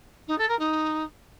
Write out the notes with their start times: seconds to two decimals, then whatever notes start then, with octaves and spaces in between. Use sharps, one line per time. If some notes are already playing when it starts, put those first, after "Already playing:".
0.27 D#4
0.38 A4
0.48 A#4
0.59 D#4